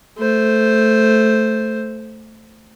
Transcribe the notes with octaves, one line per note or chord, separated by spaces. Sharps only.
A3 C5